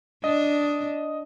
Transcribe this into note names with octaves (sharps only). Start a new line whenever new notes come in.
D4 D#5